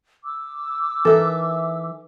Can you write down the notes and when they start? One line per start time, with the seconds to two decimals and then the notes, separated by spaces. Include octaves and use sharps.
0.24 D6 E6
1.05 E3 D#4 A4 A#4 E5